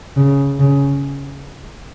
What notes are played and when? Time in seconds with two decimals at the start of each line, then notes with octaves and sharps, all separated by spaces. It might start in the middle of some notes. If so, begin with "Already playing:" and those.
0.17 C#3
0.60 C#3